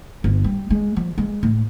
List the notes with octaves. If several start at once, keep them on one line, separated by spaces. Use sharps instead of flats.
G1
G3
G#3
F3
G#3
A2